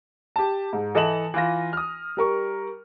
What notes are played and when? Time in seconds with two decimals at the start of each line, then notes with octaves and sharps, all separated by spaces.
0.36 G4 A5
0.73 G#2
0.95 E3 A4 D#5 E5 E7 F#7
1.34 E3 F4 A#6
1.73 D#6 F6
2.17 G3 A#4 C#6